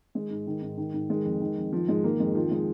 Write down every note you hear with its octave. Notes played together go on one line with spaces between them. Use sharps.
D#3 G#3
G#2
D#3
G#2
D#3
G#2
D#3 G#3
F2
D#3
F2
D#3 F3
G#2 G#3
D#3 A#3
F2 G#3
D#3 F3
G#3